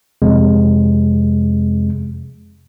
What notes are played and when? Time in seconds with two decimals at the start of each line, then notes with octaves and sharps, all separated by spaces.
0.22 F2 C3 G#3